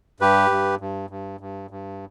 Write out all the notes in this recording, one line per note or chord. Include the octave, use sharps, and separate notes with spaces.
G2 G4 B4
G2
G2
G2
G2
G2